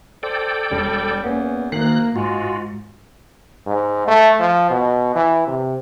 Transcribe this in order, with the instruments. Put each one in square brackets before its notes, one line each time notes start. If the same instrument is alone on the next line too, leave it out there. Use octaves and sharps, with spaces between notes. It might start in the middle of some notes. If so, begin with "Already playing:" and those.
[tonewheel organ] A4 D5 G5 [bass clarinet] C5
[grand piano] E1 D7 [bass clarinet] G3
[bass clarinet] E2 [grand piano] A#3 B3 C#4
[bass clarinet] D2 [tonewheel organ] D#3 F#6 [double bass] A#3 [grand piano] C7
[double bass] G#2 [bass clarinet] G#3 [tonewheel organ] F4 F#4
[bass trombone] G#2
A3
F3
B2
E3
C3